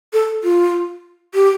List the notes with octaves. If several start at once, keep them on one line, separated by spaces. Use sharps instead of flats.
A4
F4
G4